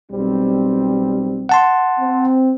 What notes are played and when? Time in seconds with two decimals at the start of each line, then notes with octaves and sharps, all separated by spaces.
0.11 B1 G3 C4
1.49 F#5 A5 C6
1.99 C4